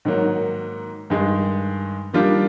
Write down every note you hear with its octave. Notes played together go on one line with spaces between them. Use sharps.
G#2 D#3 F#3 A#3
G2 D#3 G#3
D#3 G3 A#3 D4 F4